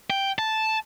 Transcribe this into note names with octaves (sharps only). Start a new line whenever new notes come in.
G5
A5